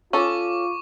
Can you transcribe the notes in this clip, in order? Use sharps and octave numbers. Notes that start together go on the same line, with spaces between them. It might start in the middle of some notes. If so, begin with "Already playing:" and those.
C#4 F4 A4 C#6 D6